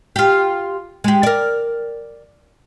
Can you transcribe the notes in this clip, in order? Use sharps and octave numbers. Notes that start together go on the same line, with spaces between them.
F4 G4
G#3 G4
A#4 D5